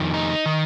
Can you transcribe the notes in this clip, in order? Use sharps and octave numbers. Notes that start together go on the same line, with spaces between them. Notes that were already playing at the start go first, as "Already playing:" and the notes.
Already playing: F2 D#3
D#4
D#3